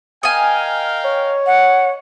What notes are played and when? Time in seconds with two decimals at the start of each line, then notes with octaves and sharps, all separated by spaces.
0.23 A#4 D#5 F5 G5 G#5
1.05 C#5
1.46 F#5